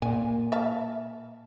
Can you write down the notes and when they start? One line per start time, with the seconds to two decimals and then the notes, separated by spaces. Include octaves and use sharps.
0.02 A#2 G#5
0.52 E5 F5 A5